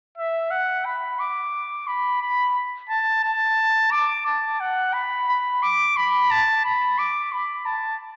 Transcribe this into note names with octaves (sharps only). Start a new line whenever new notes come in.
E5
F#5
B5
D6
B5
B5
A5
A5
D6
A5
F#5
B5
B5
D6
B5
A5
B5
D6
B5
A5